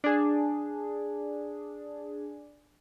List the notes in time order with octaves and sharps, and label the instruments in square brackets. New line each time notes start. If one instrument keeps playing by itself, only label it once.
[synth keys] D4 G#4